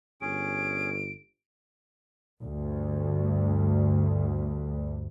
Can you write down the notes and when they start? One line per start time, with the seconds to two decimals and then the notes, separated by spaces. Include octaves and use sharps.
0.21 G1 C#4 G#4 D7
2.41 D2 G2